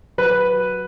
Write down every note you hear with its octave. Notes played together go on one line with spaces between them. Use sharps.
F#3 B4